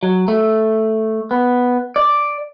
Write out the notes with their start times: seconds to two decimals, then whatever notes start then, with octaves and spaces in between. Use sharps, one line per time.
0.03 F#3
0.28 A3
1.31 B3
1.96 D5